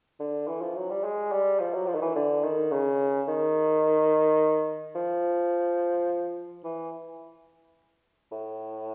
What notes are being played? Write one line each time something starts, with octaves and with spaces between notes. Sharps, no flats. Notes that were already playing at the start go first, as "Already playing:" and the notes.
D3
E3
F3
F#3
G3
G#3
G3
F3
F#3
F3
D#3
E3
D3
D#3
C#3
D#3
F3
E3
A2